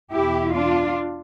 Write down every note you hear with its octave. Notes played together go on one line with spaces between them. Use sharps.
E2 B2 E4 G4
D4 F4